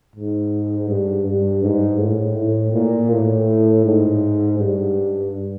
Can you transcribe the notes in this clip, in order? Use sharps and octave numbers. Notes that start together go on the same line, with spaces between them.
G#2
G2
G2
G#2
A2
A2
A#2
A2
G#2
G2